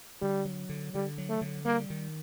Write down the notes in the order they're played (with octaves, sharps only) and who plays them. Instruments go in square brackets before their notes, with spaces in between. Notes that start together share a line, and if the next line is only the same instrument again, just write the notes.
[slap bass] D3 [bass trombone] G3
[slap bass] F#3
D3
[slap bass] D3 [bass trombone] G3
[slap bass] F#3
[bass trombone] A3
[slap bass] D3
[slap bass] G3 [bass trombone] A#3
[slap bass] D#3